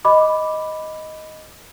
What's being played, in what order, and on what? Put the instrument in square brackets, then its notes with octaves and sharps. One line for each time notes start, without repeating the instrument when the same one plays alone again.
[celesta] D#5 B5 D6